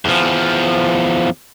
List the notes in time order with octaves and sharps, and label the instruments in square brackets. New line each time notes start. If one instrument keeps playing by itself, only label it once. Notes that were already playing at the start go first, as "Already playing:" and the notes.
[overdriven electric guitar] E2 F3